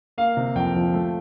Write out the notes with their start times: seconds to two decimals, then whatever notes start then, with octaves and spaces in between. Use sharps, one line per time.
0.18 A#3 F5
0.37 C3
0.55 F2 G5
0.75 F3
0.94 A3